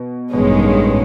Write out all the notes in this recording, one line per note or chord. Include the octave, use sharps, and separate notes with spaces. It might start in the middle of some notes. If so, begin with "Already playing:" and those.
Already playing: B2
A1 G2 B2 D#3 G#3 C#4